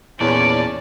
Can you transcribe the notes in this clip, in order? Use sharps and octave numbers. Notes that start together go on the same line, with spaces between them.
E2 A#2 C#4 D5 A5